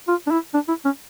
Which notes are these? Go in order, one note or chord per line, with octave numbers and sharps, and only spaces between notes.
F4
D4
E4
D4
E4
C#4